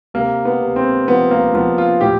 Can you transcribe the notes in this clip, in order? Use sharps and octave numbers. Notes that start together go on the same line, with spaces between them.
C3 A#3
B3
C3
C4
F3 B3
A#3
F3 B3
F4
A2 G4